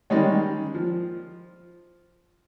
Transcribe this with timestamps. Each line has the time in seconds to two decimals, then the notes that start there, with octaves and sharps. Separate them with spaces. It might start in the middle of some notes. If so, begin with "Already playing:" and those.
0.10 D#3 G3 G#3 C#4
0.75 F3